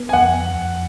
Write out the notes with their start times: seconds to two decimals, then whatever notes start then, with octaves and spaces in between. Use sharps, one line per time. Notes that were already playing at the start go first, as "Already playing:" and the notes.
Already playing: B3
0.09 G#5
0.13 F2 F#5
0.55 F2